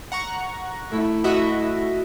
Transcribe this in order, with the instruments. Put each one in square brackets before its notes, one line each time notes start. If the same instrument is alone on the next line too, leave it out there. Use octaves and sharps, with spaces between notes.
[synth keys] F#5 A#5 C#6
[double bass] A3 E4
[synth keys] F#4 D#5 E5